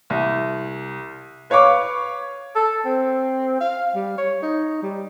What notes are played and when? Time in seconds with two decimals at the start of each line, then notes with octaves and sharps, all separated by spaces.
0.10 C2
1.50 B4 C#5 F5 C#6 D6
2.56 A4
2.85 C4
3.61 F5
3.95 G3
4.18 C#5
4.42 D#4
4.82 G3